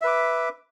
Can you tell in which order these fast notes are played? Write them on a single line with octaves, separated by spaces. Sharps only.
E5 B4 D6